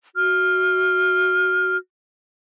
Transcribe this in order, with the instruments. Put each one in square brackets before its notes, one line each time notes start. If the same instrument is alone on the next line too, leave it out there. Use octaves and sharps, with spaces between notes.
[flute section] F#4 F6